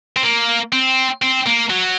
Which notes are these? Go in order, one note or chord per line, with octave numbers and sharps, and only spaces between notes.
C4
A#3
C4
C4
A#3
F#3